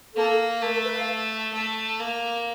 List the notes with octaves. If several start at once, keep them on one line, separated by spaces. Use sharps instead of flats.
A#3 A4
A3 A#4
A#4
B4
F5
A3
A#3